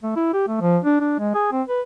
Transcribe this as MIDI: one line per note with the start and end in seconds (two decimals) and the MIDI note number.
0.03 0.13 57
0.16 0.31 64
0.34 0.45 67
0.48 0.59 57
0.61 0.78 53
0.84 1.00 62
1.01 1.16 62
1.19 1.33 56
1.34 1.51 68
1.52 1.62 60
1.69 1.81 71